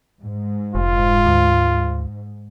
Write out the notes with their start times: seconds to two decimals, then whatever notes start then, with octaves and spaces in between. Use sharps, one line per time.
0.23 G#2
0.75 F1 F4
1.26 D2